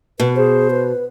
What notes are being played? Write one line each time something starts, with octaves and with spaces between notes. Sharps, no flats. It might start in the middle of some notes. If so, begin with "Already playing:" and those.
B2 B4
G#4 C5
B4